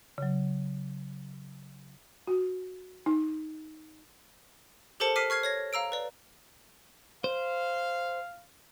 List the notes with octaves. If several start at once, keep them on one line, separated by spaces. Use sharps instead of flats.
C#3 F#3
F#4
D#4
G4 A4 A#4 C5 A5 C#7
D6 F6 B6 C7 D#7
C#6 F6 G#6 C7
C#5 G#6 A#6
F5 A#5 E6 D7
B4 D5
C5 F5